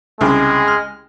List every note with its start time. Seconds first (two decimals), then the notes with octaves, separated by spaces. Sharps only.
0.21 C2 C#3 G#3
0.68 F6